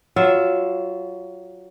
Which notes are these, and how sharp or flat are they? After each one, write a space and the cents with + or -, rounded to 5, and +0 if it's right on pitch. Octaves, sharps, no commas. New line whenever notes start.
F#3 +15 F4 +0 E5 +0